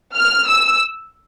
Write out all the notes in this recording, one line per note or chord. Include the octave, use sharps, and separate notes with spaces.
F6
E6